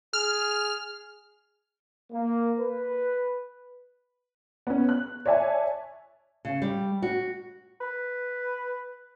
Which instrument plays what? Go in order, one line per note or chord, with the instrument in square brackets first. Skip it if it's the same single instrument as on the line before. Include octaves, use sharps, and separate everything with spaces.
[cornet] G#4 [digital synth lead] F6
[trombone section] A#3
B4
[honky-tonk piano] B3 C#4
F#6
C#5 D5 E5 G#5 A5
[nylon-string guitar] C#3
G3
F#4
[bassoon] B4